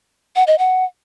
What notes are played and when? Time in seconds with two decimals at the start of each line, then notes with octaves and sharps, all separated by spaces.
0.36 F#5
0.47 D#5
0.59 F#5